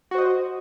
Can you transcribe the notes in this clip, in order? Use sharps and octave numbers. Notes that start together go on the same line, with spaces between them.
F#4 C5 D#5